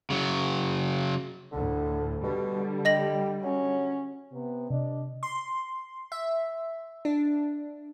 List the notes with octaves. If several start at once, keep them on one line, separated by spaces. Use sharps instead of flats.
C#3 F#3
D2 A2 D3
B2 D3 G3
G4 D#5 A#6 F#7
F#3 C#4
C3 B3
C3 D4 D5 D#5
C6
E5
D4